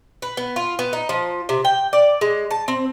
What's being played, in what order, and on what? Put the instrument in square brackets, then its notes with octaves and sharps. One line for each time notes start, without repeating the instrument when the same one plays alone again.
[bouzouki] B4
B3
F4
B3
D#4
F3
C3
G5
D5
G#3
A5
C4